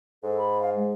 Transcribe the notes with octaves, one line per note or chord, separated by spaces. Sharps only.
G#2 A4
B5
F5
G#3